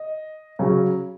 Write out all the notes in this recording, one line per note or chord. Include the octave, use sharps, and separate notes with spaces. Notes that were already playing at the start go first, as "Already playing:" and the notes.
Already playing: D#5
C#3 F#3 C#4